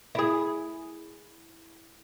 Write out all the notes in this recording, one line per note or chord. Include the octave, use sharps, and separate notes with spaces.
E4 G#4